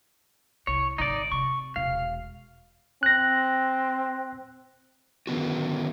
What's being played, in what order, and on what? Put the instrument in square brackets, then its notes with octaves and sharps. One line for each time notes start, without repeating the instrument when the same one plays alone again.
[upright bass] C2 [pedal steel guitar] C#5
[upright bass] G#1 D3 [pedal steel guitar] D#4 D5
[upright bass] C3 [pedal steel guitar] C#6
[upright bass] E1 [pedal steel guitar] F5
[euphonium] C4 [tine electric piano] F#6 A#6
[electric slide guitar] D3 D#3 B3 F#4